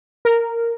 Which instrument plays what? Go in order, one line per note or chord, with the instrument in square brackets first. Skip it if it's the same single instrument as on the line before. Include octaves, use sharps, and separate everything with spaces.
[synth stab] A#4